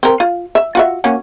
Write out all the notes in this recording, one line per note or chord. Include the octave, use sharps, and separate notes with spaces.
C4 A#4
F4
E5
F4 F#4 E5
A#3 C#4 F#4